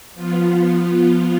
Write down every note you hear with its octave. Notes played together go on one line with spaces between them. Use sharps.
F3 B3 F4